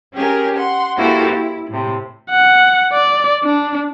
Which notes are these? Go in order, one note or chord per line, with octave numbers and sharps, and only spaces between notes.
C#4 G4 G#4 A#4
F#5 C6
A#3 E4 F#4 G4 A4 C5
E4
A2 C3
F#5
D5
D4